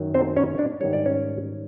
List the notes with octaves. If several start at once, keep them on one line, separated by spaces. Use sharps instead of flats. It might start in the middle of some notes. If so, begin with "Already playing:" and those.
Already playing: F#2 D#3 F#3
C4 C5
C#4 C#5
D4 D5
G#2 D#3 G3 C#5
D5
C#4 C#5